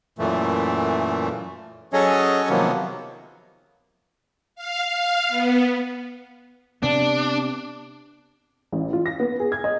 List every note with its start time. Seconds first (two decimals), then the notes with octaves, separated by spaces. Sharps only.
0.19 F#2 A#2 E3 A3
1.93 F#3 C#4 G#4 A4 C#5 D#5
2.49 C3 D#3 F3 F#3 A#3 B3
4.55 F5
4.88 F5
5.28 B3
6.83 C3 B3 D4
8.72 A1
8.93 F4
9.06 A#6
9.20 B3
9.40 G#4
9.52 G#6
9.64 D#5